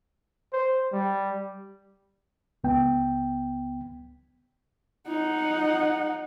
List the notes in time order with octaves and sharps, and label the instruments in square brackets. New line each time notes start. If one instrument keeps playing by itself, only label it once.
[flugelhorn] C5
G3
[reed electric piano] C#2 B3 G5
[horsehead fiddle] D#4 F#5